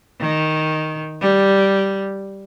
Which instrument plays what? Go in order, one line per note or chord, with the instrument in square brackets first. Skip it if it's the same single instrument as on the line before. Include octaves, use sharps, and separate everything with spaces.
[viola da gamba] D#3
G3